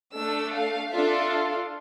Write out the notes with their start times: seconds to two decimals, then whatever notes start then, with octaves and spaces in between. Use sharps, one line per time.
0.15 A3 D4 A4 E6
0.54 F5
0.93 D4 F4 A4 E5